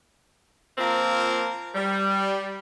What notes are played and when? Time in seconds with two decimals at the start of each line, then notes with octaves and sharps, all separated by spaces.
0.78 F3 A#3 C4 F4 A#4
1.75 G3